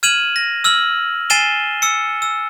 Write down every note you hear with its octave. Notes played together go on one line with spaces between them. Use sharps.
F6 G#6 D#7 E7 F#7
A#6
E6 F6 F#7
G#5 A6 C7 D#7 E7 G7
E6 C#7
E6